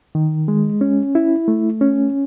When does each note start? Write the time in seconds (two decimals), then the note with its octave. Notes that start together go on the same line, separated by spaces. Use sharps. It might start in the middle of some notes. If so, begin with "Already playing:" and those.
0.15 D#3
0.48 G#3
0.81 C#4
1.15 E4
1.48 A3
1.81 C#4